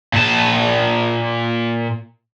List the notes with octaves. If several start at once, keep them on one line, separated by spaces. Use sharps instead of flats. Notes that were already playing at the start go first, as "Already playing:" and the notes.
A#2 A5